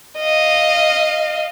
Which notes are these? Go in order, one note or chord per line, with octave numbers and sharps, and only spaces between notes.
D#5 F5